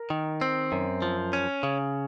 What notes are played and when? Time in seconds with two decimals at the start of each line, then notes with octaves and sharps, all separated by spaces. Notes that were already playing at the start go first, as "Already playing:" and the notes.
Already playing: A#4
0.10 D#3
0.41 C4
0.72 F#2
1.02 F3
1.33 C#4
1.63 C#3